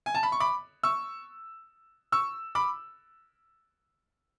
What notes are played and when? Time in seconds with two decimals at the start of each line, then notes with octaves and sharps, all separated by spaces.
0.06 G#5
0.15 A5
0.23 B5
0.32 C#6
0.40 B5 D6
0.83 C#6 E6
2.12 C#6 E6
2.55 B5 D6